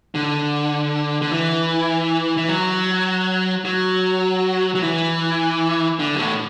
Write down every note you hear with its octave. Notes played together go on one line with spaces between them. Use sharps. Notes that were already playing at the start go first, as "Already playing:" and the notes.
D3
D3
E3
E3
F#3
F#3
F#3
E3
D3
F#2
A2